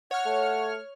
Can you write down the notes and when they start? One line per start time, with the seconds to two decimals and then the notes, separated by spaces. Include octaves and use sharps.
0.11 C#5 F#5 F6
0.26 A3